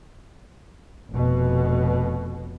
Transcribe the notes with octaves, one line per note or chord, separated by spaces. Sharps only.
F1 B2